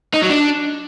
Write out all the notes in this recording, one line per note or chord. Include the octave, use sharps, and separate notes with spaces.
D#4
F#3
D4